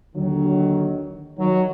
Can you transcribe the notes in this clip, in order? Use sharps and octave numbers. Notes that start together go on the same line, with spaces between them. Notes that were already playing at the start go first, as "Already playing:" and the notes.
D#2 D3 D#3 F#3
D#3 F#3